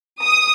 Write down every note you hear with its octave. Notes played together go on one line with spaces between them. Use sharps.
D#6